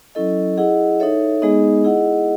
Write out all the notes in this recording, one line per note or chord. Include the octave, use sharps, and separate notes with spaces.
F#3 C#4 E4 A4 D#5
E4 G#4 D#5 F#5
D#4 A4 C#5 E5
G#3 B3 D#4 G#4 D#5
E4 G#4 D#5 F#5